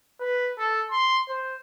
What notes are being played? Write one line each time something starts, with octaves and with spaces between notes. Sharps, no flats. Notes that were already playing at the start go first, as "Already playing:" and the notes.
B4
A4
C6
C5